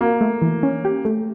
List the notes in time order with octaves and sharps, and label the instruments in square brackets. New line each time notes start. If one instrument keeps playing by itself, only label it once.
[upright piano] A#3 [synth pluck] F#4
[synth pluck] A3
E3
C#4
G4
A3